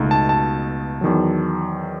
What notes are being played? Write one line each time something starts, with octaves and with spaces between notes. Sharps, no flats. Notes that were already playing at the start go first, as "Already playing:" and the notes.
Already playing: C#2 B2 A3 D#4
A5
A5
E2 D#3 F#3